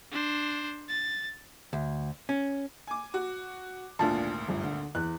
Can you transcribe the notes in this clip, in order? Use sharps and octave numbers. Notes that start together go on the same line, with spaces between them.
D4 C5
A6
D2
C#4
G#5 D6
F#4
G#1 D2 A#2 D4 F4 A5
G1
D3
E2 F#6